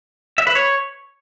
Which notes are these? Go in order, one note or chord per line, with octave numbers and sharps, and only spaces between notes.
E5
B4
C#5